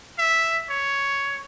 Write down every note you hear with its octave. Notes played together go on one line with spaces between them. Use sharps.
E5
C#5